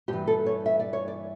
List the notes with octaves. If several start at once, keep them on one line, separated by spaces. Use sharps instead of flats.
G2 E3 G4
A4
C#5
E5
D5
C#5
D5